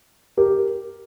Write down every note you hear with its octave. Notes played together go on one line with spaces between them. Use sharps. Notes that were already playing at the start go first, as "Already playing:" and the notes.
G4 A#4